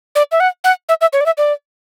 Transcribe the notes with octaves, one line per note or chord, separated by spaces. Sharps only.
D5
E5
F#5
F#5
E5
E5
C#5
D5
E5
D5